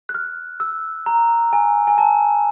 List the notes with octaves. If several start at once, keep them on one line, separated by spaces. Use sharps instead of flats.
F#6
F6
E6
A#5
G#5
G#5
A5